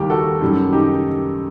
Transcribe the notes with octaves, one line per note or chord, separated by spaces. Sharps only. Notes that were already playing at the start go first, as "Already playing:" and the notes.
Already playing: D#2 D#3 G3 G4 A#4
F#4 A4
F#2 D#3 G3
D#4 G4